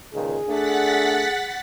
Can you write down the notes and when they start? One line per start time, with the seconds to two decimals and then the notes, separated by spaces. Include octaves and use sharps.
0.14 C#2 A#2 D#3 G#4
0.47 A3 D4 F#5 A6 B6